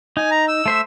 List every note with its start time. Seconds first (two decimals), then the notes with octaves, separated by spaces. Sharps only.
0.17 D#4 G#5
0.31 A#5
0.48 E6
0.66 A3 C5 E5